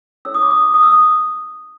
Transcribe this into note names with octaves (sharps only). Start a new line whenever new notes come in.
C#4 E4 A4 C#5 E6
D#6
D6
D#6
D#6
E6
D#6